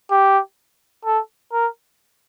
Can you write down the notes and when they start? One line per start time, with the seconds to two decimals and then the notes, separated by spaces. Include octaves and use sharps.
0.11 G4
1.05 A4
1.53 A#4